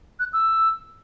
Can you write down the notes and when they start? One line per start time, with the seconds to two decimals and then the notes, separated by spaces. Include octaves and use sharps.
0.20 F#6
0.33 E6